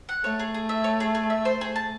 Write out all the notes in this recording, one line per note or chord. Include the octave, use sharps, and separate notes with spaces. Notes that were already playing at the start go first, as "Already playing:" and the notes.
F#5
A3 C#5
G#4
G#4
E5
C#5
G#4
G#4
E5
C5
G#4
A5